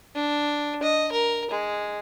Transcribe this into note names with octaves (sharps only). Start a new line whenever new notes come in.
D4
D#5
A#4
G#3